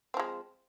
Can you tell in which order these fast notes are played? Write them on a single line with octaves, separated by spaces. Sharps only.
C4 F3 G#3